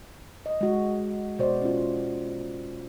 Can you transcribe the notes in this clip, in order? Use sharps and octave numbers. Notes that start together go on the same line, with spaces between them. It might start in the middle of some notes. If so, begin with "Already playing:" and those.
D#5
G#3 F#4
B2 F#4 C5 D5
C#4 F4